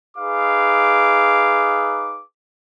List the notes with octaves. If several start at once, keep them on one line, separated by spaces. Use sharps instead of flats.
D#4 G#4 B4 F5 D6